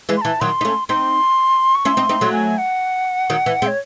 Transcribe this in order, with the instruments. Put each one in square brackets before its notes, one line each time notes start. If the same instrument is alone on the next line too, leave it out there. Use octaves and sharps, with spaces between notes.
[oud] E3 G#3
[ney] C6
[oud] E3 [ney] A5
[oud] D#3 F#3 [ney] C6
[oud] D#4
A3 C#4
[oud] C4 D#4 [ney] C6
[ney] C#6
[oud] C#4 E4 [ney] C6
[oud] C4 D#4
C4 D#4
F#3 A3
[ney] G#5
F#5
[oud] D#3 F#3
E3
G#3 C4
[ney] C#5